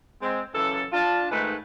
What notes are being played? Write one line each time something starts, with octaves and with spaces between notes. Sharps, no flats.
G#3 C4
F#2 C#3 E3 A4
D4 F4 A5
G#2 D#3 G#3 A3 B4